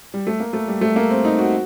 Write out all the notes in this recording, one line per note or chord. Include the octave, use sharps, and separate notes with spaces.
G3
A3
A#3
A3
G3
A3
A#3
C4
D#4
F#4